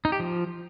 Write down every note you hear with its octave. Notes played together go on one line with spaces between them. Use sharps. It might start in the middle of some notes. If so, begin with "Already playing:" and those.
D#4
G4
F3